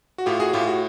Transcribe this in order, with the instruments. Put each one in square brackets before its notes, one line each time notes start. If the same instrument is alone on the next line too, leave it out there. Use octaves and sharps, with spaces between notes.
[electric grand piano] F#4
A2 F4 G4
F#4 G#4
A2 F4 G4
F#4